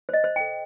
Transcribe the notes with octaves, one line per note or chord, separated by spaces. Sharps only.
C5 D#5
C5
G5
A4